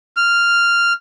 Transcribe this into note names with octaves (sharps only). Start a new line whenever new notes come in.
F6